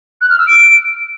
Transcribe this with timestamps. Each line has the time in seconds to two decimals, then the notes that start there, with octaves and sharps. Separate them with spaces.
0.21 F#6
0.30 F6
0.38 E6
0.47 D7